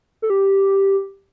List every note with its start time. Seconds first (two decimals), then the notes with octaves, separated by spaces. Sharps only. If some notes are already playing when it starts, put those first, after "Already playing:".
0.22 A4
0.30 G4